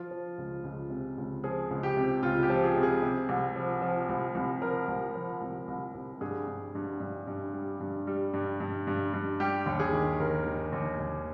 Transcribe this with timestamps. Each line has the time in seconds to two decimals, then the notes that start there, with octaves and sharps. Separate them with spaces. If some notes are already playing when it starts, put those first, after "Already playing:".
Already playing: F3 F4
0.11 F3
0.38 C#2
0.64 C#2
0.90 C3
1.18 C#2
1.44 F3 G#4
1.71 C#2
1.83 G4
1.97 C3
2.23 C#2 F4
2.43 G4
2.50 F3
2.64 G#4
2.77 C3
2.83 G#4
3.03 C3
3.29 C2
3.56 F3
3.82 F3
4.09 C2
4.35 C2
4.62 F3 A#4
4.88 C2
5.15 F3
5.42 C2
5.68 C2
5.95 C2
6.21 G2 G#4
6.48 G2
6.75 G2
7.00 G2
7.27 G2
7.54 G3
7.80 G2
8.07 G3
8.34 G2
8.60 G2
8.87 G2
9.14 G2
9.40 G3 G4
9.66 D#2
9.79 G#4
9.93 D#3
10.20 D#2 A#4
10.46 D#3
10.72 D#2
11.00 D#2